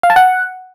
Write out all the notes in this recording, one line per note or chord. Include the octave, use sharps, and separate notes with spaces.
F5
A5
F#5